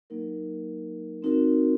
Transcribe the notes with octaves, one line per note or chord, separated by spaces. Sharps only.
F#3 A#3 D#4 A#4
C4 D#4 F#4 A#4